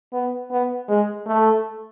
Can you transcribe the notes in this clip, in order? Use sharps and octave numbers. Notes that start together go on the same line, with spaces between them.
B3
B3
G#3
A3